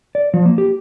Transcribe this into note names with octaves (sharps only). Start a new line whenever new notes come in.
D5
F3
A#3
G4